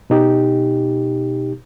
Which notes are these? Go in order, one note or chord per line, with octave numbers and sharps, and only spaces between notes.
B2 D#4 G4